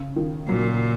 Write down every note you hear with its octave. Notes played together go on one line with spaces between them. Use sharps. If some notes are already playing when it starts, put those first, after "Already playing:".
Already playing: C#3
D#3
A#2 F#3